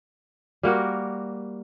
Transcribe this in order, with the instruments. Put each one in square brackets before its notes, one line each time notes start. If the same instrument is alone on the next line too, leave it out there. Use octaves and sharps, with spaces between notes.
[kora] G3 A#3 F#4 A#4